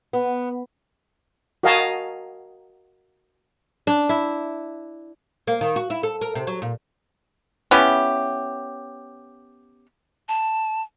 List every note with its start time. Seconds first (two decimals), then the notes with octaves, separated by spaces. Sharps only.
0.13 B3
1.63 F#4 A#4 D#5 F5 G#5 A5
3.87 D4
4.09 E4
5.47 A#3
5.61 D#3
5.76 F#4
5.90 E4
6.03 A4
6.21 A#4
6.35 C3
6.47 F#3
6.62 A#2
7.71 B3 C#4 E4 G4
10.28 A5